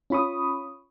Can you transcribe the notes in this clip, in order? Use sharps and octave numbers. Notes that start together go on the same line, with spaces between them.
C#4 F4 B5 C#6 D#6